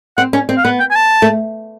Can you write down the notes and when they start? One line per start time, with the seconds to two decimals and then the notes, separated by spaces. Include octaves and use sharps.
0.17 C4 F#5
0.33 C#4
0.49 C4
0.58 F5
0.64 B3 F#5
0.80 G5
0.91 G#5
0.96 A5
1.22 A3